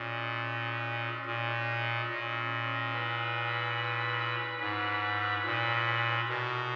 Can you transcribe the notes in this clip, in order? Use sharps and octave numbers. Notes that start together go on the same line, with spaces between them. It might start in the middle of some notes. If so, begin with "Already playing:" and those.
Already playing: A#2 E3 G#3 C#4
A#2
A#2
G#3 C#4 E4 B4
G#2
A#2
B2 G#3 C#4 E4 A#4